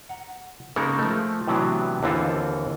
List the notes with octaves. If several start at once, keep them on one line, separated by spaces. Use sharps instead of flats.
F#5 A#5
C#3 G#3 A#3 D#4 A4 A#4
F3 A3
A2 C3 E3 F#3 B3 D4
D#2 D3 E3 C4 F4 A4